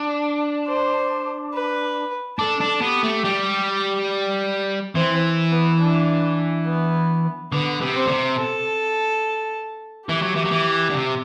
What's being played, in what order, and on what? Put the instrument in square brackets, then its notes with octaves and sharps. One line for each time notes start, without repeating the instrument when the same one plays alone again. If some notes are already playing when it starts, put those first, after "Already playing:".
Already playing: [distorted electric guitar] D4
[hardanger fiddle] C5
B4
[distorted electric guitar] D4 [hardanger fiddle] A4
[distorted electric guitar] D4
[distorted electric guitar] B3 [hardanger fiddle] G4
[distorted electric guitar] A3
G3
[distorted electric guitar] E3 [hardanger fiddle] C4
[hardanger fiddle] B3
D4
B3
[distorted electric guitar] D3 [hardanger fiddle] B3
[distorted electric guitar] C3
[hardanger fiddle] C4
[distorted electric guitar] D3
C3
[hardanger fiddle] A4
[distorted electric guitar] E3 [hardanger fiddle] G4
[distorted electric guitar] F#3
E3
F#3
E3
D3
C3